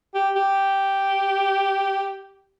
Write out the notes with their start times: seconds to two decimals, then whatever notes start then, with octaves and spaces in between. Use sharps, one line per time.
0.15 G4
0.36 G4